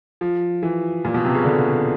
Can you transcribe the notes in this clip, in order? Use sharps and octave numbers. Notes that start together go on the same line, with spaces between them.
F3
E3
A#2
B2
C3
C#3
D3